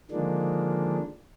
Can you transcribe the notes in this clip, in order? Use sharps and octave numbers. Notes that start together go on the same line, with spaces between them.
D3 D#3 F3 G#3 A#3 D4